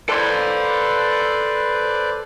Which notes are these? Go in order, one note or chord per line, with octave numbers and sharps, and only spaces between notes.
A4 B4 C5 D5 C6